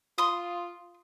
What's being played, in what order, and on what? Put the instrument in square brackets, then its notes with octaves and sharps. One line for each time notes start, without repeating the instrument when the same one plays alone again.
[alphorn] F4 [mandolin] C6 D#6